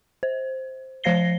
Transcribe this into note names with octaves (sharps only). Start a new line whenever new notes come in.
C5
F3 C5 F5 A#6 C7 G7